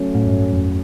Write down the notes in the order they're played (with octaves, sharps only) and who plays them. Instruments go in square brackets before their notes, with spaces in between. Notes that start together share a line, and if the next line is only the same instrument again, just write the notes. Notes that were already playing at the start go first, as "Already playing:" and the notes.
Already playing: [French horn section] F#3 A3 C#4
[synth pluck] A2
G2
F2